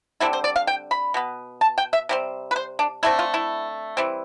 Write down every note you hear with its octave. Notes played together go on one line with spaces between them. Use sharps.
D3 G3 C4 E4
C5
D5
F5
G5
B5
B2 B3
A5
G5
E5
C3 G3 C4
B4
C5
D4
D3 A3 C4 E4
F4
E4
E3 G3 C4